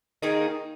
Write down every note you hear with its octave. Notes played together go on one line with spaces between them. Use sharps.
D#3 A#3 D#4 G#4